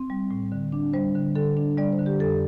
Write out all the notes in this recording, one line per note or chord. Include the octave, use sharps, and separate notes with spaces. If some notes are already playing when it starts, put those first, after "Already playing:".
Already playing: C4
G3
A2
D3
D4
G3 C5
D3
D3 A4
D4
G3 D5
C5
D3
G4
F2 A4